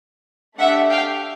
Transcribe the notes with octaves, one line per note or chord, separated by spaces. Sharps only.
A3 D4 G4 E5 F#5
F5 G5